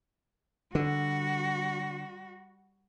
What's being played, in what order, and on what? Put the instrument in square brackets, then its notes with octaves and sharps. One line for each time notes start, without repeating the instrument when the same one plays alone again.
[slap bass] D3 [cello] G3 F#4